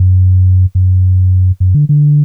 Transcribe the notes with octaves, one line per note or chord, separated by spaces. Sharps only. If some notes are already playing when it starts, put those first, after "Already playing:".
Already playing: F#2
F#2
F#2
D3
D3